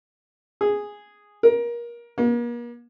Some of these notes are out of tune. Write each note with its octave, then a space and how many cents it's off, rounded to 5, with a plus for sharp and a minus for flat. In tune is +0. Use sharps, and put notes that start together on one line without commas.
G#4 -5
A#4 +25
A#3 +40